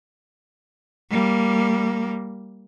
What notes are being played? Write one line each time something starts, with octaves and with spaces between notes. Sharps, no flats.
G3 A#3